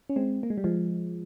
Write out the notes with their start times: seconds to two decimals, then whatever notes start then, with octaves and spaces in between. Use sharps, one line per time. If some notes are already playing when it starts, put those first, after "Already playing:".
0.09 C#4
0.16 G#3 C4
0.43 A#3
0.50 G#3
0.58 G3
0.64 F3 G#3